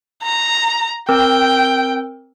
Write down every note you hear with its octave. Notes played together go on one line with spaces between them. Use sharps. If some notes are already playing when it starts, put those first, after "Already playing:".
A#5
C4 A#4 G5 E6